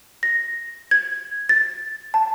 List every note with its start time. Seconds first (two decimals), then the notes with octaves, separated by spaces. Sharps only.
0.23 A#6
0.91 G#6
1.49 A6
2.14 A5